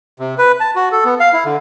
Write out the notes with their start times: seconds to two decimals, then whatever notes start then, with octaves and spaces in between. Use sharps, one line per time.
0.19 C3
0.38 B4
0.60 A5
0.76 F#4
0.92 A4
1.05 B3
1.20 F5
1.33 E4
1.45 D3